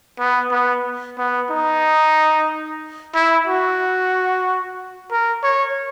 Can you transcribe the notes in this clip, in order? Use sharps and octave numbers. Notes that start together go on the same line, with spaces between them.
B3
B3
B3
D#4
E4
F#4
A#4
C#5